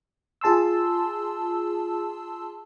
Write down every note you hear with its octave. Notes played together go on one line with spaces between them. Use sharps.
F4 G#4 A5 C6 E6